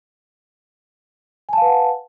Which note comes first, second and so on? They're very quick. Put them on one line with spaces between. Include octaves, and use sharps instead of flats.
G#5 A5 F5 B4 F#5